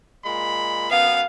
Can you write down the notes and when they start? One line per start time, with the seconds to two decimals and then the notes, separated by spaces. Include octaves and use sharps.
0.25 A#2 G#3 B5
0.90 F#2 B3 F5